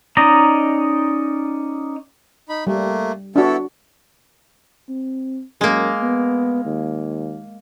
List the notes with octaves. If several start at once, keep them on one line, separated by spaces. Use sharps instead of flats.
C#4 D#4 D5 D#5 A#5
D#4 B5
G3 A3 A#3
B3 D4 E4 F#4 A4
C4
F#2 G#3 A#3
B3
D#2